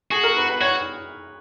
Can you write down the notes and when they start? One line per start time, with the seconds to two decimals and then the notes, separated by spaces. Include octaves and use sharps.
0.11 F#4 G#4
0.24 A#4
0.36 B4
0.49 B4
0.61 F#4 C#5